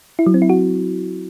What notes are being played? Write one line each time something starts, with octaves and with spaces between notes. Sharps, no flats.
E4
F#3
C4
E4
F#4